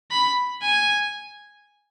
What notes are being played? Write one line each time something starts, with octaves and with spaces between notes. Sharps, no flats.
B5
G#5